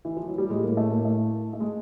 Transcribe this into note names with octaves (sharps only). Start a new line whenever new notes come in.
E3
F3
F#3
G3
A2 G#3
A#3
A3
A#3
A3
A3
G#3